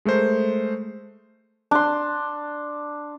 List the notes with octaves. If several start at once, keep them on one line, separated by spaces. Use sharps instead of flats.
G#3 A3 A#4 C5
D4 C6